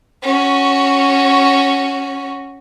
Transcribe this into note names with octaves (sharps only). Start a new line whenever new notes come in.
C#4 F#4